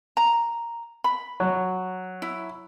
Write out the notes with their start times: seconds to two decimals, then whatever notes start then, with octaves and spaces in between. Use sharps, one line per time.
0.17 A#5
1.04 B5
1.40 F#3
2.22 E4